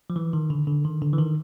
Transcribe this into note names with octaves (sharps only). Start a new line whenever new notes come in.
F3
E3
D#3
D3
D3
D#3
D3
E3
D#3